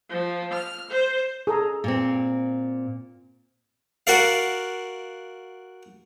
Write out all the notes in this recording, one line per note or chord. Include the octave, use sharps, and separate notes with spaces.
F3
F6
C5
G#4 A4 A#5
A#2 C4
F#4 A#4 D5 F5